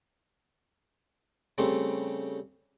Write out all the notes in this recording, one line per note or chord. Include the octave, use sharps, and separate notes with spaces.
C#3 G3 A3 C4